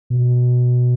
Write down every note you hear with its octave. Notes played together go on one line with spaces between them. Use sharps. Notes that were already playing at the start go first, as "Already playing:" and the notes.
B2